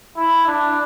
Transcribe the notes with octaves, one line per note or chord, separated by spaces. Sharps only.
E4
D4